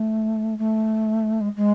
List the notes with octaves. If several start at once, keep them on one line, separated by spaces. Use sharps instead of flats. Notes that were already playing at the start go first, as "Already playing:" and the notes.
Already playing: A3
A3
G#3
G#3